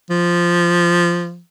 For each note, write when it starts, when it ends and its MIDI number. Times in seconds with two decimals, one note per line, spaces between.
0.10 1.40 53